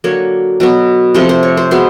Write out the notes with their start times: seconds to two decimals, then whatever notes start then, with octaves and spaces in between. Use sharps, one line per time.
0.04 D3 F#3 A#3 C#5
0.60 B2 F#3 B3
1.14 C3 F3 A3 C5
1.29 C5
1.43 C#5
1.57 C5
1.71 B2 G#3 B3 C5